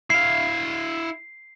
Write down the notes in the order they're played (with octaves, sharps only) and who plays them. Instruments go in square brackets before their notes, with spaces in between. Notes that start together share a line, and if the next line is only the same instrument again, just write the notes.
[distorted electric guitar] E4 F5 [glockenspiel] C7